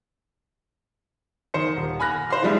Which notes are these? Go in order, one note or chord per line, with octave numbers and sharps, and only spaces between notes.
D#3 C5 C#7
D#1
G#5 B5 F6 F#6 A#6
C5 F5 B5 C6
E3 F3 G3 G#3 D4 E4